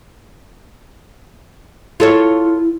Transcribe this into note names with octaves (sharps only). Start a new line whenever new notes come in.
E4 F4 A4 C#5